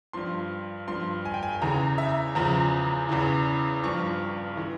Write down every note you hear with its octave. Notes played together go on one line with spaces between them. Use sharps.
G2 F3 C6
G2 F3 C6
G#5
G5
G#5
E2 C#3 E3 A#5
E5
E2 C#3 F3 A#5
E2 C#3 E3
G2 F3 C#6
E3